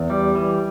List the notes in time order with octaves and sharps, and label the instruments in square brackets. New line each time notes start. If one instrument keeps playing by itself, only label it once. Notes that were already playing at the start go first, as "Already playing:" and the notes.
Already playing: [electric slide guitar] E2
G3
E3